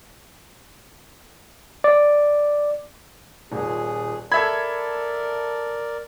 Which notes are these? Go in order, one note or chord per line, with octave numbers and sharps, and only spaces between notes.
D5
D#1 A#2 G#4
A4 A#4 D5 E5 B5 E6 G#6